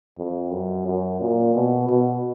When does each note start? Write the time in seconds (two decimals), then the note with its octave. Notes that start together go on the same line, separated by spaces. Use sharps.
0.18 F2
0.52 F#2
0.86 F#2
1.20 A#2
1.55 B2
1.89 B2